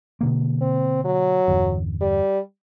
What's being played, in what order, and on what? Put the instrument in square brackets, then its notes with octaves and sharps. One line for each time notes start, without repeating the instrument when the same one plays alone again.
[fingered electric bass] B2 D3 A#3
[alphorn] C4
F#3
[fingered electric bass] G1 E2
[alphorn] G3